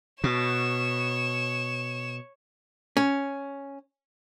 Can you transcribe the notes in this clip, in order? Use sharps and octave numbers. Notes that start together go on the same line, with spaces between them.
B2 C#5 E7
C#4